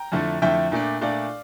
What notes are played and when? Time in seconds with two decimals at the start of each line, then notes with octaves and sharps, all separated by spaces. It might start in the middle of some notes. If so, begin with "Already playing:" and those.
Already playing: G5 A#5
0.12 F2 D3 A3 E4
0.42 F2 D3 A3 E4 E5 G5
0.72 A#2 A3 D4
1.01 A#2 A3 D4 D5 F5